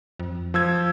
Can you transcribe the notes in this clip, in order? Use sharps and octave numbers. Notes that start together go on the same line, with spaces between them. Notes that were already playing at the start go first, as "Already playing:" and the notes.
F2
F3 E6 G#6